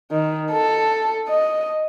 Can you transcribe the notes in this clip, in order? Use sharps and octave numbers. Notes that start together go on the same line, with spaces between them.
D#3
A4
D#5